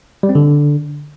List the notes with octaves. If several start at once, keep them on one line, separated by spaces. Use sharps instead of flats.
G3
C4
D3